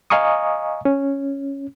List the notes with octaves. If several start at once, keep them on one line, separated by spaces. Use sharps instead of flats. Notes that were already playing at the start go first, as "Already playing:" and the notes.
D#5 F5 G#5 A#5 C#6 D#6
C#4